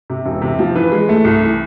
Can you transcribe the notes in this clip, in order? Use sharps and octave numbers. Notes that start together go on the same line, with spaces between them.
C3
E1
C3
F3
E3 B4
G#3
A3
C2
E3